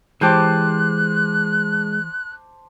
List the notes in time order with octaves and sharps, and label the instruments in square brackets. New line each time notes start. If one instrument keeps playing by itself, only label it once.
[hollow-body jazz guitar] E3 G4 [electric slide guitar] G#3 [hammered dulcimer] C5 A5 D6 [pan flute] F#6